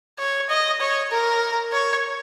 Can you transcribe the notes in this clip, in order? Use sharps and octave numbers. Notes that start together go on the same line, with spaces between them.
C#5
D#5
C#5
A#4
C#5